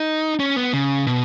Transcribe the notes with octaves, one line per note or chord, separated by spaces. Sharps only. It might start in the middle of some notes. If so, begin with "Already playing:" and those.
Already playing: D#4
C#4
B3
C#3
B2